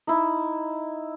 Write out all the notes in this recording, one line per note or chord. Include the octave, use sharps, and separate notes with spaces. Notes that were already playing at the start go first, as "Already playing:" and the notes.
D#4 E4